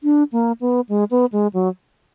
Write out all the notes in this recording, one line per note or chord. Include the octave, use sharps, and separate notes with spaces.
D4
A#3
B3
G#3
B3
G#3
F#3